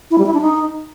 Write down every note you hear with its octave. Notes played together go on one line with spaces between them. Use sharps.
E4
G3
E4
D4
D#4